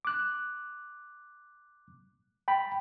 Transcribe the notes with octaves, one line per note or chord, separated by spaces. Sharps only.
D6 F#6
G5 B5